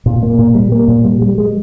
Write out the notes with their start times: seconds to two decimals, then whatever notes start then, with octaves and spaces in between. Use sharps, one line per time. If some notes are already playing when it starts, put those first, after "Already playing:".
0.06 A#2
0.23 A#3
0.39 A#2
0.55 G3
0.72 A#3
0.88 A#2
1.05 G3
1.22 G3
1.38 G#3